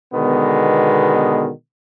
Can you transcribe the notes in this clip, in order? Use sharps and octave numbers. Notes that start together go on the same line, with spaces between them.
B2 D3 D#3 G#3 B3